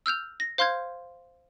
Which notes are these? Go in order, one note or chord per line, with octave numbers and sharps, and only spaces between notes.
E6 F6 G6 F7
A#6
C5 F5 C6 F6 G6 G#6